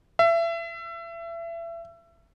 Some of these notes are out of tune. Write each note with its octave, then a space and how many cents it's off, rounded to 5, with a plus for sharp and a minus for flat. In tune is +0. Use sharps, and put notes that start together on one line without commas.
E5 +30